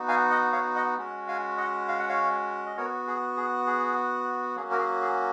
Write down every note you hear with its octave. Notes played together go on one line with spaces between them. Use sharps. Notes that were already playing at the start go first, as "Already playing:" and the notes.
Already playing: B3 D#4 F#4
F5 G#5
D#5 F#5
C#5 F5
D#5 F#5
G#3 C#4 F#4
F5 G#5
D#5 F#5
F5
F#5
C#5 F5
D#5
B3 F#4 A#4 C#5
G#4
G#4
G#4
F#3 A#3 C#4 F#4 G#4
A#4
G#4
G#4